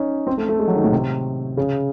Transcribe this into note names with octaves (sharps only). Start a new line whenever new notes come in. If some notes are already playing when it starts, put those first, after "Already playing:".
Already playing: C#4 D#4
C4
A3
A3
G#3
F#3
D#3
A2
C3
C#3